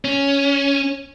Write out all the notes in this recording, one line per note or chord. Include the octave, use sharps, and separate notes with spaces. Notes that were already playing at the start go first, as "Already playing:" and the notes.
C#4